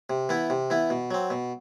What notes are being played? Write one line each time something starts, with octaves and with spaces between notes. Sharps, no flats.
C3
E3 B3 E4
C3
E3 B3 E4
B2
F#3 C4
B2